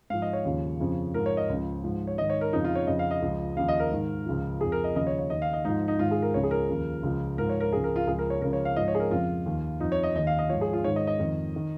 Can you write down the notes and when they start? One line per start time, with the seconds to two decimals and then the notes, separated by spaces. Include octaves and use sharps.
0.10 G#2 F3 F5
0.22 D#5
0.33 C#5
0.45 D#2 C#3 F3
0.80 F2 C#3 F3
1.14 G#2 F3 A#4
1.26 C#5
1.37 D#5
1.49 C#2 C#3 F3
1.84 G#2 F3
2.07 C#5
2.18 G#2 D#3 D#5
2.30 C#5
2.41 A#4
2.53 F2 C#3 F3 D#4
2.64 F4
2.75 C#5
2.87 F2 C#3 F3 D#5
2.99 F5
3.11 D#5
3.22 C#2 C#3 F3
3.57 D#2 C#3 F3 F5
3.68 D#5
3.79 A#4
3.91 G#2 D#3
4.26 C#2 C#3 F3
4.61 F2 F3 G#4
4.72 A#4
4.84 D#5
4.95 D#2 C#3 F3 D#5
5.07 C#5
5.19 C#5
5.30 D#2 D#3 D#5
5.42 F5
5.53 D#5
5.65 G#2 F3 D#4
5.88 D#4
5.99 G#2 D#3 F4
6.11 G#4
6.22 A#4
6.34 C#2 C#3 F3 C#5
6.43 G#4
6.51 A#4
6.69 D#2 C#3 F3
7.03 C#2 C#3 F3
7.38 G#2 F3 A#4
7.49 C#5
7.60 A#4
7.73 C#2 C#3 F3 G#4
7.84 A#4
7.96 F4
8.07 C#2 C#3 F3 G#4
8.19 A#4
8.30 C#5
8.41 C#2 C#3 F3 A#4
8.53 C#5
8.65 F5
8.76 G#2 F3 D#5
8.88 C#5
8.95 G#4
9.00 A#4
9.11 F2 C#3 F3 F4
9.46 D#2 D#3
9.80 F2 F3 D#4
9.92 C#5
10.03 D#5
10.15 D#2 D#3 D#5
10.27 F5
10.39 D#5
10.49 G#2 F3 C#5
10.61 G#4
10.73 F4
10.84 G#2 D#3 C#5
10.96 D#5
11.07 D#5
11.19 F2 D#3
11.56 D#3